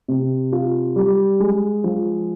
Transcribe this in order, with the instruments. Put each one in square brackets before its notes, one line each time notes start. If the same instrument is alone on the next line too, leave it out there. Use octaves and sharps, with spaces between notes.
[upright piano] C3
F4
G3
G#3
F3